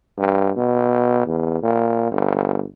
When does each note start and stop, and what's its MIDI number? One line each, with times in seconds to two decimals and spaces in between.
0.18 0.51 43
0.57 1.26 47
1.26 1.60 40
1.63 2.09 46
2.11 2.64 31